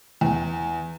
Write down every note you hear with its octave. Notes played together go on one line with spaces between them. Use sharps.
E2